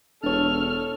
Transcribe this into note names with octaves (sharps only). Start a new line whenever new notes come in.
E1 D4 A4 C#5 F6